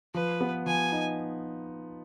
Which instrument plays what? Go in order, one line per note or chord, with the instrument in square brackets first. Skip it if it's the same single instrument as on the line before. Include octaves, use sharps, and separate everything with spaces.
[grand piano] F3 [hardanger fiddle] B4
[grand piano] B3
[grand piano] F3 [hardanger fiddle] G#5
[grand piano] D#4